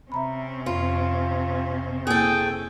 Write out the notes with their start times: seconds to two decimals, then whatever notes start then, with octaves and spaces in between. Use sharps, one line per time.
0.12 C3 C#4 C5 E5 A#5 B5
0.66 F2 F4 B5
2.07 A#3 E4 G#4 A4 G5